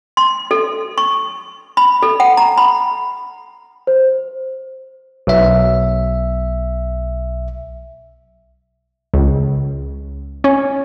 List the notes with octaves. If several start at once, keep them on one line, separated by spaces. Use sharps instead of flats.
C6
A4
C#6
B5
A4
F#5
A#5
B5
C5
B1 E5
C#2
C#4